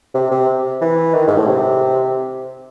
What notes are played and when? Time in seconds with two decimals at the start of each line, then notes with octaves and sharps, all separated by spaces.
0.15 C3
0.31 C3
0.81 E3
1.14 D#3
1.27 G#2
1.38 A2
1.48 C3